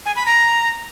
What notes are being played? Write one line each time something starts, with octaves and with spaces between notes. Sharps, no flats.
G#5
B5
A#5